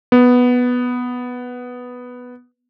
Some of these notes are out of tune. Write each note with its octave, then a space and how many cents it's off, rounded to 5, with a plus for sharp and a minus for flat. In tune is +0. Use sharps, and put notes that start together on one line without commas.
B3 +0